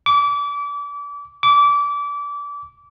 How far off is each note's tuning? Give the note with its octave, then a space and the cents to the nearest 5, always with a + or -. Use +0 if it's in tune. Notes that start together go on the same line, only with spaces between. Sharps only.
D6 -30
D6 -25